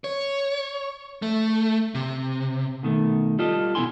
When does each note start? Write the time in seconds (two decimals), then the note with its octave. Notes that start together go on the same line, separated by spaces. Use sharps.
0.04 C#5
1.22 A3
1.95 C3
2.83 B2 D#3 A3
3.39 G3 F4 A4 D#5
3.75 B2 F3 E4 G#5 C6